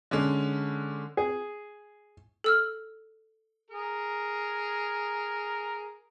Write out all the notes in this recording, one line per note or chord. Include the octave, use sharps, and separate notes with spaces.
D3 G#3 C#4
G#4
A4 E6 F6
G#4 A#4